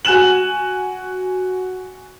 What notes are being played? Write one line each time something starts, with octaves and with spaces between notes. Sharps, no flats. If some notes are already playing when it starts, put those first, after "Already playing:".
F#4 G#5 F#6 E7 F#7